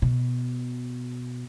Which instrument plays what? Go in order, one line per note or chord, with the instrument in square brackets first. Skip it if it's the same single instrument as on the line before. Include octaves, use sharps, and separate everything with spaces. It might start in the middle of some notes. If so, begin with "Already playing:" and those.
[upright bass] B2